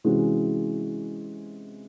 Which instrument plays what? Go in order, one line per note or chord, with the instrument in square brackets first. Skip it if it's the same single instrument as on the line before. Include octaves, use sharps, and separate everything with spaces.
[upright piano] C3 E3 G#3 C#4 F#4